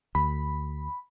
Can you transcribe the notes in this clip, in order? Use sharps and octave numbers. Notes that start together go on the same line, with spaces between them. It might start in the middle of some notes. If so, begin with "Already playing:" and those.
D2 B5